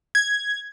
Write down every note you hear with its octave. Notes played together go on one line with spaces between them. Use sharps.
G#6